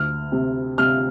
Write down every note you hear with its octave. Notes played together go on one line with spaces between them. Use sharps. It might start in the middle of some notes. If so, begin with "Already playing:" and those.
Already playing: D2 F6
C3
C3 F6